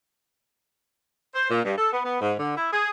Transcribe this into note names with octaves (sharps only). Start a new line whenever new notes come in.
C5
A#2
G2
A4
B3
B3
G#2
D3
E4
G#4